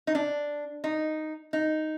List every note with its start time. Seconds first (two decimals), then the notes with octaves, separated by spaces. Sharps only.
0.07 D#4
0.15 D4
0.84 D#4
1.53 D#4